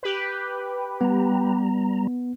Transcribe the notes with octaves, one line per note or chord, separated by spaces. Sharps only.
G4 B4
G3 B3 A#5